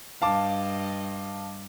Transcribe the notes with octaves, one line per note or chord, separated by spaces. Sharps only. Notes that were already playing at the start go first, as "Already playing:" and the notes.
G2 D#5 F5 A5 D6